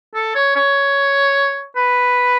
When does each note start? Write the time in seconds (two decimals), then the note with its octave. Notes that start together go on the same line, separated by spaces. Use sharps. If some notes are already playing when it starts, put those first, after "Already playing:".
0.15 A4
0.35 C#5
0.56 C#5
1.76 B4